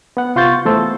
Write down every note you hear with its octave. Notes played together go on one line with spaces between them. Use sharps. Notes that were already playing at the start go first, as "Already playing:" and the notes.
B3 F#5
C3 F4 C6 C#6 G6 A6
E3 A3 B3 A4 C5